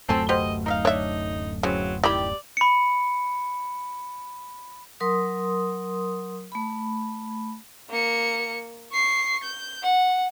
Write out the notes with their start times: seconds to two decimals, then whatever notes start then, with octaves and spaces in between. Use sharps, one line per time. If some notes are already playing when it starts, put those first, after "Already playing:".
0.09 D1 F#2 F3 A3 C4 G#5 A5
0.29 B2 G4 C5 D#5
0.66 D#4 A#4 E5 F5
0.85 D3 D4 C#5 E5
1.63 C#3 E3 F#3 B3 C4
2.04 D#3 G3 E4 G4 D5 B5
2.57 B5 C#7
5.00 F#3 A#4 C6 D#6
6.52 A3 B5
7.90 A#3 C#7
8.92 C#6 C7
9.43 G6
9.83 F#5